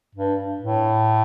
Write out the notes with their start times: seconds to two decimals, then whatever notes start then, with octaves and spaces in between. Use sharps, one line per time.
0.15 G2
0.61 A2